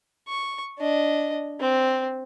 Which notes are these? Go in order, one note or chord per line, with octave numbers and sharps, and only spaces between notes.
C#6
D4 D#5
C4